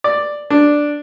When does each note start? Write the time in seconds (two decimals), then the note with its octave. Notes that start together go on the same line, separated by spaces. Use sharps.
0.04 D5
0.50 D4